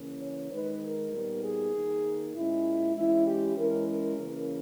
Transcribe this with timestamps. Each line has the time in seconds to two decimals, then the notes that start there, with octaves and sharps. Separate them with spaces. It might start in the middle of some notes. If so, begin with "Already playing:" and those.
Already playing: C#3 E3 A#3 C#4
0.21 C#5
0.51 D#3 G#3 D#4 B4
0.82 A#4
1.12 A#2 G3 B3 D#4
1.43 G#4
1.73 D#3 A#3 D#4
2.35 A#2 G#3 C#4 E4
2.95 E3 G#3 C#4 E4
3.26 G4
3.56 E3 G#3 C#4 A#4
3.86 A#4
4.17 C#3 E3 A#3 C#4